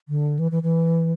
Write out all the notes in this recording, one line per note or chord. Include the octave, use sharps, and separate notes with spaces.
D3
E3
E3
E3